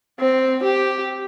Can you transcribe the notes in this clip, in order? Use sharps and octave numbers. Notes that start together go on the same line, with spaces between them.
C4
G4